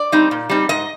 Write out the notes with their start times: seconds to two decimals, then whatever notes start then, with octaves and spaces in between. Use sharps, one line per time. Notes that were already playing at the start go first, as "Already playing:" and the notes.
Already playing: D5
0.12 G3 C4 D#4
0.31 A#2
0.50 G3 C4 D#4
0.69 G#2 D#5